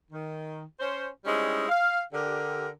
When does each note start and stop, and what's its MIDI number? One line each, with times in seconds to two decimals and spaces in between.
0.11 0.62 51
0.80 1.07 61
0.80 1.07 72
1.25 1.67 55
1.25 1.67 56
1.25 1.67 60
1.25 1.67 61
1.25 1.67 63
1.25 1.67 64
1.69 2.00 77
2.13 2.68 50
2.13 2.68 67
2.13 2.68 70